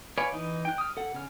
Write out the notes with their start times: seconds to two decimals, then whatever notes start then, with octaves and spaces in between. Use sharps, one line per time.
0.18 B4 C#5 D5 F5 G#5
0.32 E3 D#4
0.65 G5 F#6
0.78 D#6 F6
0.97 A4 F#5
1.15 C#3 F6